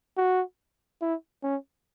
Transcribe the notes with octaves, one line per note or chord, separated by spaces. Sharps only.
F#4
E4
C#4